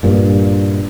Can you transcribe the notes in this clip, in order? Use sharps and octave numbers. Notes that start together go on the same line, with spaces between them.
G2 A#2